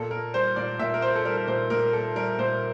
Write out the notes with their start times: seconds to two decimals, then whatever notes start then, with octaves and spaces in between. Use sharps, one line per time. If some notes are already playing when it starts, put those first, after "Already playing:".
Already playing: A#2 A4
0.11 A#3 A#4
0.34 G3 C5
0.56 A#2 D5
0.79 A#2 E5
0.94 A#4
1.02 A#3 C5
1.15 A4
1.25 G3 A#4
1.37 A#4
1.47 A#2 C5
1.70 A#2 A#4
1.93 A#3 A4
2.16 G3 A#4
2.39 A#2 C5